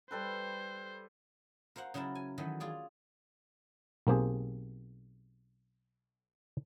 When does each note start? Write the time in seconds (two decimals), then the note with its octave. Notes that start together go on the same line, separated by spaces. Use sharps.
0.11 G3 A4 B4 C5
1.76 A#4 C5 F5 F#5
1.94 C#3 F#3 E4 A#4 A5
2.15 G#5
2.38 D#3 E3 F#3 A3
2.60 F4 G#4 D5
4.07 B1 A#3 C4 G4 G#4